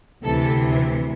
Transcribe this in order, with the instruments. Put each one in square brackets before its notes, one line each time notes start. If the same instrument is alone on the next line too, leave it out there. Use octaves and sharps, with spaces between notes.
[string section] D2 C3 E3 A4